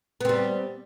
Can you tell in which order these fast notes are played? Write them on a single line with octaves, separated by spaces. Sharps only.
B3 C4 G3